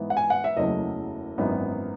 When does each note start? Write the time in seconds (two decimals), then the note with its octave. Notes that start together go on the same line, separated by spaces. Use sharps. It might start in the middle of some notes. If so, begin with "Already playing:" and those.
Already playing: G#2 E3 B3 D#4
0.10 F#5
0.17 G#5
0.30 F#5
0.44 E5
0.57 F#1 E2 C#3 F#3 A3 D#5
1.38 G#1 F#2 E3 B3 D#4